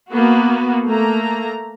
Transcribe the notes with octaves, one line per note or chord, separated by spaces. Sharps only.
A#3 B3 F#4
A3 A#3 A#5